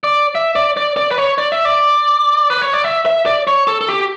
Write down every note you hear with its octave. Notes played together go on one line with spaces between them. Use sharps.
D5
E5
D5
D5
D5
B4
C#5
D5
E5
D5
B4
C#5
D5
E5
E5
D5
C#5
A4
A4
G4